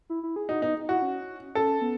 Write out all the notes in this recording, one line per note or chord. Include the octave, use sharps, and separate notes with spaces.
E4
E4
G#4
D#4 F#4
B3 D#4
D#4
E4 F#4
C#4
C#4 A4
B3